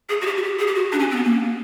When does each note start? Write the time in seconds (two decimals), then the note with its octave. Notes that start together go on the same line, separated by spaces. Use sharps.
0.09 G#4
0.21 F#4
0.26 G4
0.37 F#4
0.43 G4
0.59 G#4
0.67 G4
0.75 F#4
0.92 D4
1.00 C#4
1.11 C4
1.16 B3
1.24 A#3